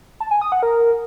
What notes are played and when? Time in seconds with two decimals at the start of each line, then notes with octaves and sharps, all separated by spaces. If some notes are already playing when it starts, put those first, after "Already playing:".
0.20 A5
0.31 G#5
0.42 D#6
0.52 F#5
0.63 A#4